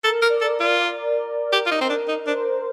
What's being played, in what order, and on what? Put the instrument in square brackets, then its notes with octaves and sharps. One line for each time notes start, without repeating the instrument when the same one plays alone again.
[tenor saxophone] A4 [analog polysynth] A#4
[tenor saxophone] A#4
[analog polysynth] D5
[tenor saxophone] A4
[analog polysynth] A#4
[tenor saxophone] F4
G4
F4
D#4
C4
D4
D#4
[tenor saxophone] D4 [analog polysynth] C5